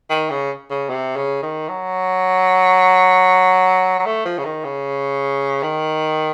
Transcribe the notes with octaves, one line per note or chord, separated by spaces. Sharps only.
D#3
C#3
C#3
C3
C#3
D#3
F#3
F#3
A3
F3
C#3
D#3
C#3
D#3